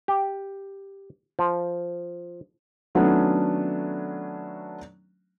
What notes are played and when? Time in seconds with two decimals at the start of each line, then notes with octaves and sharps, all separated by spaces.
0.08 G4
1.39 F3
2.95 D#3 F#3 A3 B3 C#4 D4